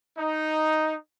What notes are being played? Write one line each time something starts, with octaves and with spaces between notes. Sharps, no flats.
D#4